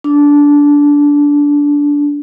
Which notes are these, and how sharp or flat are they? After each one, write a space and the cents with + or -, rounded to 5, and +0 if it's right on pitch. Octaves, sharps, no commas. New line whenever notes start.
D4 -15